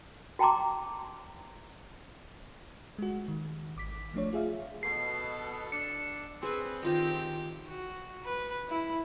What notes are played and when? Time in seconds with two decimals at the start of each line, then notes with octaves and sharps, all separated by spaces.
0.39 F#4 G5 A5 A#5 C6 D6
2.99 G#3 F#4
3.28 D#3
3.76 G#1 D6 B6
4.14 F3 A3 D4 C#5
4.33 F4 G#4 E5 F5
4.83 B2 A4 C7
5.72 D4 C#7
6.43 C4 G#4 B4 G#5
6.83 D#3 F4 G4 D#5
7.67 F#4
8.24 B4
8.69 E4